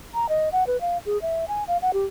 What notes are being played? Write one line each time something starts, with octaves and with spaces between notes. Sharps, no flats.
A#5
D#5
F#5
B4
F5
G#4
E5
G#5
F5
F#5
G4